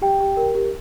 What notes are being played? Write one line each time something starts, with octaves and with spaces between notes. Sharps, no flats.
G4 G5
G4
A#4
G4